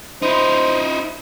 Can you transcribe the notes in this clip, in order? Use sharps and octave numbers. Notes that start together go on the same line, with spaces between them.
D#4 E4 C5